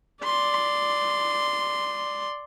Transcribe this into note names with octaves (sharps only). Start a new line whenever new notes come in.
D5 C6